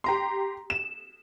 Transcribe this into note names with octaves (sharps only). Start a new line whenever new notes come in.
G4 A#5 C6
E7